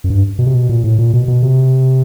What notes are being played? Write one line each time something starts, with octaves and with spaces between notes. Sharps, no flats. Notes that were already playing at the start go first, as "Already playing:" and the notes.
F#2
G2
B2
C3
B2
A#2
A2
A#2
B2
B2
C3